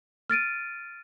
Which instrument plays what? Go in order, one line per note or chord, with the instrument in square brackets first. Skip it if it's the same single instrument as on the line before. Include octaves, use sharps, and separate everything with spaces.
[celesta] F6 A6 D7 D#7